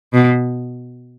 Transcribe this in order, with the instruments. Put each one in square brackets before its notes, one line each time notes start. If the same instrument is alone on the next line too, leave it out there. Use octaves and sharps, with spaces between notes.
[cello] B2